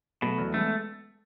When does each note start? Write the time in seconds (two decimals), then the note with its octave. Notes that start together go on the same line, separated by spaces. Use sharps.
0.22 B2 F#3 A3
0.38 E2
0.54 G#3 A3 B3